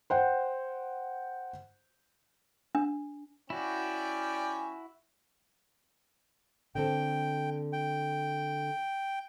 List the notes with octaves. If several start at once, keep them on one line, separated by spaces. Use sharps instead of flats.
C5 F#5 G5
D4
C#4 E4 F#4 D5 G5
D3 C4 A4 G5
G5